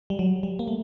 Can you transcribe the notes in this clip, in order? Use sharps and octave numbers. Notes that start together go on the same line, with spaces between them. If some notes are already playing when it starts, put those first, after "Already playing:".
G3
F#3
G3
A#3
A3